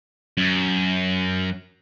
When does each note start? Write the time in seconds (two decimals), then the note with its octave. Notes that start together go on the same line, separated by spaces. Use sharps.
0.37 F#2